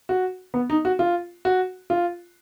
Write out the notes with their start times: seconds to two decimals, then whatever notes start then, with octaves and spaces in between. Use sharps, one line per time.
0.09 F#4
0.54 B3
0.70 D#4
0.85 F#4
0.99 F4
1.45 F#4
1.90 F4